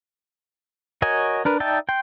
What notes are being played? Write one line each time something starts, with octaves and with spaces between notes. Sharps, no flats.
F#4 A#4 C#5 D#5 G#5
D4 A#4 B4
D#4 D5 E5 G5 A5
G5 C6